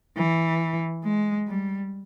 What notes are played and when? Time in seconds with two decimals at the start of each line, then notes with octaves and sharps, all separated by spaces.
0.17 E3
1.04 G#3
1.47 G3